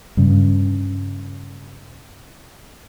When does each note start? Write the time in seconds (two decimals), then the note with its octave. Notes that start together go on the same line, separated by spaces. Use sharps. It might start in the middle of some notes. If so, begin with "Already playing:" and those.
0.17 G2 C#3